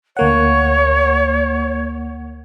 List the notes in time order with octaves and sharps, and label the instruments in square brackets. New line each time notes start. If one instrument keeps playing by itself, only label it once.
[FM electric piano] D2 A#3 F#5 [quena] C#5